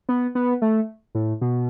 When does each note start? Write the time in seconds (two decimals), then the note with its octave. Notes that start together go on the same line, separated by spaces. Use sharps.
0.09 B3
0.35 B3
0.62 A3
1.15 A2
1.41 B2